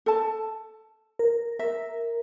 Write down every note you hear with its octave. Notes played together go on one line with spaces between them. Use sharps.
A4 A5
A#4
A#4 E5